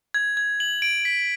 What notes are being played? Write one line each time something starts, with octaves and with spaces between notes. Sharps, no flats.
G#6
G#6
F#7
D7
B6